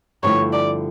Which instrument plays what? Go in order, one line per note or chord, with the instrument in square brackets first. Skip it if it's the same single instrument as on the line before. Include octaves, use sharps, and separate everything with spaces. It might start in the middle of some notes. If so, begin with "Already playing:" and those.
[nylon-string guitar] G2 D3 F3 A3 E4 [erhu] C#5
[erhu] D5